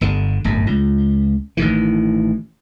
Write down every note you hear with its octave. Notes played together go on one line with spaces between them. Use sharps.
G1 D3
D1 G1 F#2
C#2
A1 D#3 E3